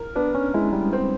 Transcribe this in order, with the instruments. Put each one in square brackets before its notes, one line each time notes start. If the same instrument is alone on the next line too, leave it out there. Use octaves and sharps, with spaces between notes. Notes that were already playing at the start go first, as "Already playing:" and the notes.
Already playing: [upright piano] A#4
[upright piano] B3 [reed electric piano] D4
[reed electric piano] C#4
[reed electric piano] G#3 [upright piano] E4
[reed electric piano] G3
[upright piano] C4